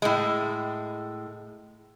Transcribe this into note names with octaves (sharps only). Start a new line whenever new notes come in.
A2 G#3